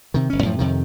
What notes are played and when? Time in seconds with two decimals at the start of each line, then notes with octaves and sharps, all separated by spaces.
0.14 C3 D#3
0.30 G1 C#4
0.43 F#2 A2 F3
0.59 F2 C3 D#3